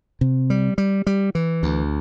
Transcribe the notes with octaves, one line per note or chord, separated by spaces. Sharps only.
C3
G3
G3
G3
E3
D2